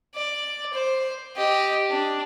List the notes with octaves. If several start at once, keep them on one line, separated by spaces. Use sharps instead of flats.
D5
C5
G4 D#5
D4